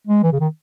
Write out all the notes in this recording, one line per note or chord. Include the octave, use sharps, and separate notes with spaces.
G#3
E3
C#3
D#3